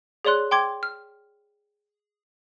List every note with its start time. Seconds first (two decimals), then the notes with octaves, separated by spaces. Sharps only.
0.25 G#4 C#5 D5 C6 F#6
0.51 G5 C6 D6 G#6
0.83 F6